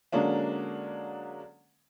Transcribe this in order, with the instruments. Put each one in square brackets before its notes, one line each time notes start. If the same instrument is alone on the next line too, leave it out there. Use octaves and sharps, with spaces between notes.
[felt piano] D3 F#3 G#3 A#3 C#4 D4